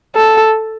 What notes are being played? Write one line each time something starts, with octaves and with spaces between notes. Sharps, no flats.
A4